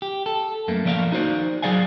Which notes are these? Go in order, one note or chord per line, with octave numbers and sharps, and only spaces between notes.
G4
A4
F#2 A3 A#3
F3 A#3 D5 D#5 F5
D#4 F#4 C5 D5
F#3 G#4 D5 F5 G#5